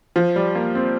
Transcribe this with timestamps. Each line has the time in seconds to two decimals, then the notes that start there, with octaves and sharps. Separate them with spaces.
0.16 F3
0.36 G3
0.55 A#3
0.75 C4